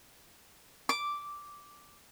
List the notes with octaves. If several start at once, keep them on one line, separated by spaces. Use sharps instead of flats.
D6